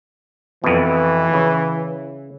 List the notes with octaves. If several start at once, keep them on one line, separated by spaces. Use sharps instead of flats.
F2 B2 E3
C#3